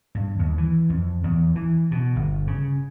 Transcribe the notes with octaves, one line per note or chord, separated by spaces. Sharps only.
G2
D#2
E3
F2
E2
E3
B2
G1
C#3